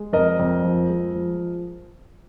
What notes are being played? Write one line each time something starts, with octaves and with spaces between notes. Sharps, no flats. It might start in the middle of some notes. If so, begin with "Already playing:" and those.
Already playing: G#3
F2 A#4 D#5
F2
F3
G#3
F3